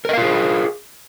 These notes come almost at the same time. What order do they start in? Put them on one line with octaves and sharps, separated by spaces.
A#4 D#5 F5 F4 G#4